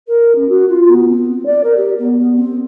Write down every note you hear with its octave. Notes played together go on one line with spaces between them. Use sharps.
A#4
C#4
F#4
F4
B3
C4
D5
A#4
G4
B3
B3
C4